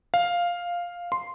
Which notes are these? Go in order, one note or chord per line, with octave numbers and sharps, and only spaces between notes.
F5
C6